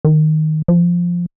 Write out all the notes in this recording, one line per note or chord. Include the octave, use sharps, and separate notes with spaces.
D#3
F3